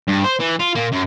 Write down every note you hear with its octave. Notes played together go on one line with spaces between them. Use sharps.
G2
C5
E3
F4
A#2 A#3
F#2